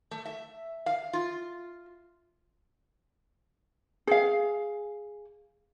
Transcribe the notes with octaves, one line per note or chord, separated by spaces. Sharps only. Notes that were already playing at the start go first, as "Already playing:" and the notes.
A3
E5
F5
F4
G#4 F5